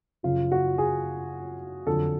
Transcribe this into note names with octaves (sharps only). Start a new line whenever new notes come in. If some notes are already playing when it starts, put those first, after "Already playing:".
F#2 C#3 F3 F4
F#4
G#4
F2 D3 F#3 A4